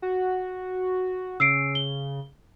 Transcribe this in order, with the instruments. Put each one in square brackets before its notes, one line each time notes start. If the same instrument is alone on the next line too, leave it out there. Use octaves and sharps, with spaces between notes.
[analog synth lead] F#4
[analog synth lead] C#3 [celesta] E6 C7 D7
[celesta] G7